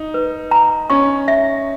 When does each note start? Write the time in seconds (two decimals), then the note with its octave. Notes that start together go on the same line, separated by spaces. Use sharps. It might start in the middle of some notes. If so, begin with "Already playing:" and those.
Already playing: D#4
0.14 B4
0.51 A#5
0.90 C#4 C#6
1.28 E5